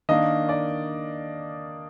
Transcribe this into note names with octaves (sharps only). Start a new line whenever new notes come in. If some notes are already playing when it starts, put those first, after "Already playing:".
D#3 A#3 D4 D#5
D5